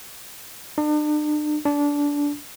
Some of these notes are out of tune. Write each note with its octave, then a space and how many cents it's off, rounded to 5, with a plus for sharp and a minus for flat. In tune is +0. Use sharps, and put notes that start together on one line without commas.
D4 +40
D4 -20